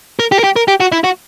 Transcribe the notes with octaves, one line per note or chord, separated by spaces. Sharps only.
A#4
G4
A#4
G4
A#4
G4
F#4
E4
F#4